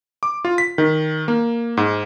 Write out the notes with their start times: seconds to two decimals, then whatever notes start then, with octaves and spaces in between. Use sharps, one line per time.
0.23 D6
0.45 F4
0.58 B6
0.78 D#3
1.28 A#3
1.77 G#2